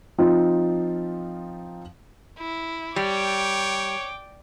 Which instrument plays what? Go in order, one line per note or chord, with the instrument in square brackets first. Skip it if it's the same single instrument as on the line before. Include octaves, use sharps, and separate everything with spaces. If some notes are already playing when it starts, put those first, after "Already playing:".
[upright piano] F3 C4 D#4 F4
[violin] E4
[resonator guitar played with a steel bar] G3 [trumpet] C#5 [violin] G5 D6